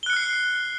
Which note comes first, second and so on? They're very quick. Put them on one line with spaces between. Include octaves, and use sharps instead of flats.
G7 F#6 C#7 F6 C7